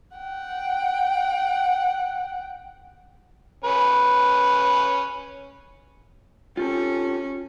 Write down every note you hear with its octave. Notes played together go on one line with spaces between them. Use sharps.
F#5 G5
C#4 B4
C#4 F4 G4 A4